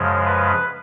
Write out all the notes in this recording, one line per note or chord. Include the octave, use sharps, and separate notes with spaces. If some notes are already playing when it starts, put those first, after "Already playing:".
Already playing: F#2 C#3 F3 G#3
B4